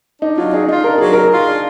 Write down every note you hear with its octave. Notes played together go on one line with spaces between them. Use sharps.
D4 D#4
F#3 F4
D#4 G#4
D#4 F4
D4 A#4
F#3 G#4
G#4 A#4
F4
D4